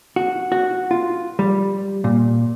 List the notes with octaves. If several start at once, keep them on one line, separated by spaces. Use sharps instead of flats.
F#4
F#4
F4
G3
A#2